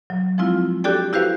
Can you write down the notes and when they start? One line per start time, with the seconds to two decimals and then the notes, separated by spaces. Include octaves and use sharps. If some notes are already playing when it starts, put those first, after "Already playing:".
0.10 F#3
0.38 F3 G#3 C4 E4 F4
0.84 D4 F#4 G4 A4 D5 G5
1.13 E4 F#4 G4 B4 C5 F5